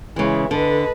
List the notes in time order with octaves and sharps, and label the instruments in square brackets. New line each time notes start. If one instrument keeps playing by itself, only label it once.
[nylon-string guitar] C#3 E3 [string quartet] G#3 E4
[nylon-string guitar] D3 [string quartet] A4 B4 D#5